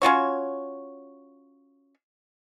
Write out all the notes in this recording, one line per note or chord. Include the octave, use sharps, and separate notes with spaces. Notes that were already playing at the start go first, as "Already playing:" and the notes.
C#4 F4 F#4 C#5